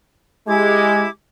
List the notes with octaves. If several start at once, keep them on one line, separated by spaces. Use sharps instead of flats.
G#3 E4 G4 D6 G#6